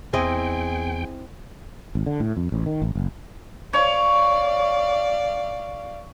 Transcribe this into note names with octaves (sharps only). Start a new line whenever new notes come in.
E2 C4 E4 G#4 D#5 G5
G#1
D3
A2
F2
A1
D#3
A1
F#1
C#5 D5 F5